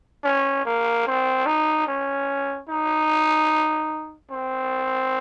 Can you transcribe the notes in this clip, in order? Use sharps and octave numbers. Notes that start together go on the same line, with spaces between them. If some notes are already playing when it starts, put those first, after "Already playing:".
C#4
A#3
C4
D#4
C#4
D#4
C4